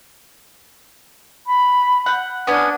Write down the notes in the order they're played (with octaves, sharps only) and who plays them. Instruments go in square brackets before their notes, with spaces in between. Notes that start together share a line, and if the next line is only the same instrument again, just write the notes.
[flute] B5
[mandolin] F#5 G6
[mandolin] B3 C#4 G#5 [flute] D4